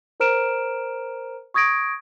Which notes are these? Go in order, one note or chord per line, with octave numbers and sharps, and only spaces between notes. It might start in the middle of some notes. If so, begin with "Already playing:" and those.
A#4 C5 A#5 F6 D7 E7
C#6 D#6 G#6 A#6 D7